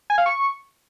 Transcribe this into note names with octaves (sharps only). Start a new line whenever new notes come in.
G#5
F5
C#6